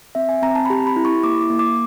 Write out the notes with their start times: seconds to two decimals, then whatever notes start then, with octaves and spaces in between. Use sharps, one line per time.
0.15 C4 E5
0.29 G#5
0.42 C4 A#5
0.55 A5
0.65 B5
0.70 G4 A#5
0.87 B5
0.96 E4
1.05 C#6
1.23 A#3 D6
1.41 D6
1.50 A#3
1.59 D6